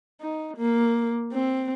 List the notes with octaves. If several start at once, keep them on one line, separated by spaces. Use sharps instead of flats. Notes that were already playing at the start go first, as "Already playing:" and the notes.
D#4
A#3
C4